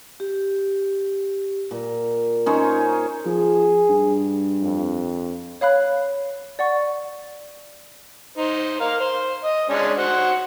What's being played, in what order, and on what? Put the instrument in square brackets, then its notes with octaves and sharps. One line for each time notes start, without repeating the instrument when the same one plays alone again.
[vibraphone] G4
[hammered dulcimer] A#2
C#4 D#4 C5 C#5
[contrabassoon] F3 [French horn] G#4
[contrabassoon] G2
[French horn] F2
[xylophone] C#5 F5 B5 F#6
D5 F#5 C#6
[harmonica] D#4 C5
A#4 F5
C5
D#5
G#3 C#4 D4
F#4 C5 F#5